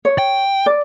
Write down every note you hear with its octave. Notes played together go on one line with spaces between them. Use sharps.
C#5
G5
D5